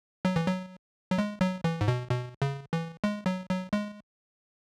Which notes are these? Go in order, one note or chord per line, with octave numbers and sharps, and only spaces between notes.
F#3
E3
F#3
F#3
G#3
F#3
E3
G#2
B2
B2
C#3
E3
G#3
F#3
F#3
G#3